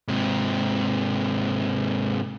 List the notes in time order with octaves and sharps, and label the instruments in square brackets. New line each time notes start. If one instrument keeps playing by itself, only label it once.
[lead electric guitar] G#2 C3